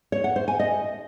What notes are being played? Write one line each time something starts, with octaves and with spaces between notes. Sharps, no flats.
C#5
F#5
C5
G#5
D#5